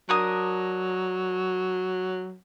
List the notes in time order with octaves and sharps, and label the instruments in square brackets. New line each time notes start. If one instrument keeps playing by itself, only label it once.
[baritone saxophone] F#3 [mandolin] D4 A#4 D#6